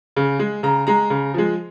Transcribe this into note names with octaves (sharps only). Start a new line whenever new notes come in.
C#3
G#3
C#3 A#5
G#3 A#5
C#3
F3 G#3